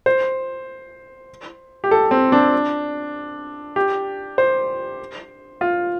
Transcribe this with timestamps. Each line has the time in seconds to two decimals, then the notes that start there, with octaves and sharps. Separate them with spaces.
0.06 C5
1.84 G4
1.91 A4
2.11 C4
2.32 D4
3.76 G4
4.38 C5
5.61 F4